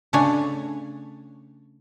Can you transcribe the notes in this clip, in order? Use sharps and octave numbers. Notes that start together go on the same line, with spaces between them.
C#3 A3 D4 C#5 G#5